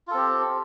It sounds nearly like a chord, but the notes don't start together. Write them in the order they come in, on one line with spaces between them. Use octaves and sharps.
F4 A4 C4 G4